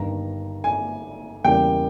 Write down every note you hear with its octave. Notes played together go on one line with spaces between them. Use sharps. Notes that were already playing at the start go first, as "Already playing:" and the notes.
Already playing: G1 G2 D#3 A#5
G#5
E2 C#3 G3 A#3 G5